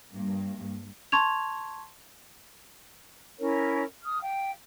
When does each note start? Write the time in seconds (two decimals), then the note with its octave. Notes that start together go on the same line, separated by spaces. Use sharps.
0.13 G2 A#3
1.12 A5 C6 C#6 G#6 F7
3.39 C#4 E4 A#4 C#5
4.03 D#6 F6
4.22 F5 G5